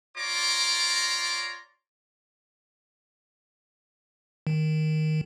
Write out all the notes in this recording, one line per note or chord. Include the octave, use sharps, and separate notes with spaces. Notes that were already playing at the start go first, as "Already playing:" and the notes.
F4 C#5 D5 A#5 C6 D6
D#3